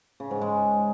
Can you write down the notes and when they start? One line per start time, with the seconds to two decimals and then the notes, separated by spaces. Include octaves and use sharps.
0.20 C#3
0.31 G#2
0.41 G#3